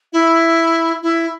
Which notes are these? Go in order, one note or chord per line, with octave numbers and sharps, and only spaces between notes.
E4
E4